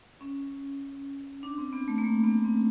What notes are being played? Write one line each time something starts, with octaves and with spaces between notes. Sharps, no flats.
C#4
D4
C4
B3
A3
A#3
A3
B3
C4